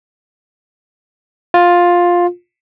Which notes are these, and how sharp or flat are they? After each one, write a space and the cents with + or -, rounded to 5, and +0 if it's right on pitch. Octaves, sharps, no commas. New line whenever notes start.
F4 +10